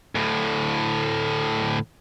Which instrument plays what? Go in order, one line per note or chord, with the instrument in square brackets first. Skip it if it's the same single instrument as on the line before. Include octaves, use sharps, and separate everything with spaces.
[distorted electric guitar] D2 A2